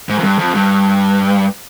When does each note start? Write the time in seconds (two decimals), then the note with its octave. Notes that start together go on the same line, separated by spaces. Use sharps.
0.09 G#2
0.18 F2
0.24 G2
0.39 F2
0.55 G2